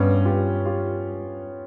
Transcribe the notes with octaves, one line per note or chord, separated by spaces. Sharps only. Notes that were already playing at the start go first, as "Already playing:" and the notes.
Already playing: G2 B3 C#4
F4 G4
F4 G4